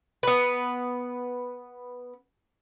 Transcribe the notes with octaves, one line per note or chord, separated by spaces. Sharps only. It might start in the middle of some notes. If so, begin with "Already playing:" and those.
B3 B4